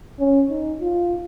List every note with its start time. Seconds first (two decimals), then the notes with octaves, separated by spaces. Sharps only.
0.20 C#4
0.50 D#4
0.81 F4